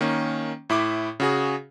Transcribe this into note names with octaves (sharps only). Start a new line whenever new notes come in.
D#3 A#3 C#4
A2 E4 B5 D6
C#3 F#4 G#4